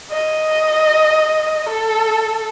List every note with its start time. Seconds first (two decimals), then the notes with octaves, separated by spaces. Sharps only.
0.11 D#5
1.70 A4